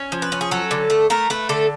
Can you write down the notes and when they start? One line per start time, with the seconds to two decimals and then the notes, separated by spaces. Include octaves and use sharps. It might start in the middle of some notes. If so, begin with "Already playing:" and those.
Already playing: C#4
0.12 F3
0.22 B4
0.32 C#4
0.41 G#4
0.51 F#3 A4
0.71 D3
0.90 A3
1.10 A3 A#4
1.30 A3 B4
1.49 D3 A4